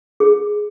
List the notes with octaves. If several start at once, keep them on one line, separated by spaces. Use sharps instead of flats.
G#4